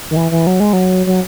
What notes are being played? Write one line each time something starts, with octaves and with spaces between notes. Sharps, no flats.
D#3
E3
E3
F#3
G#3
F#3
F#3